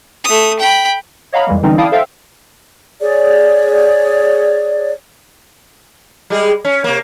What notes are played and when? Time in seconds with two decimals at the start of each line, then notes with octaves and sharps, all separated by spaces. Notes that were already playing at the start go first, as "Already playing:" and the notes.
0.24 A3 D#6
0.59 G5 B5
1.32 C#5 D#5 F5 F#5 A#5 B5
1.47 F2 E3 G3 G#3 A#3
1.63 D3 E3 G3 C4 C#4 D#4
1.78 E4 D5 F5 G5 A5 D#6
1.92 A4 C5 E5 F5 G5
3.00 G#4 C#5 D5
6.30 G3 G#3 G#4
6.65 C#4
6.84 C3 A#3